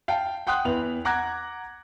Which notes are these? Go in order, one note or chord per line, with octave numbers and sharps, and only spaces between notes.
F5 G5 A5
F#5 G5 C6 D#6 F#6
E2 E4 B4 F7
F#5 A#5 D6 F#6 G#6 A#6